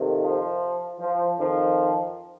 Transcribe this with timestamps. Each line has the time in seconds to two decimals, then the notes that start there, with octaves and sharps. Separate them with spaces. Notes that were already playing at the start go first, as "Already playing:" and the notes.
Already playing: F2 C3 D#3
0.22 F3
1.00 F3
1.38 F2 D#3 F3